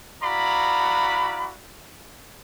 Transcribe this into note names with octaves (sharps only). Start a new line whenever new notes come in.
E4 F#4 D5 F5 A#5 B5